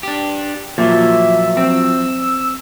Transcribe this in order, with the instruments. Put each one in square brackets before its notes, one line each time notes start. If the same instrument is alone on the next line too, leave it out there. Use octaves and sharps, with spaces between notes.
[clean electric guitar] D4 G4
[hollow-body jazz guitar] A#2 [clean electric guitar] F3 F#3 [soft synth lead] E5
[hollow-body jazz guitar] C4 [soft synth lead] E6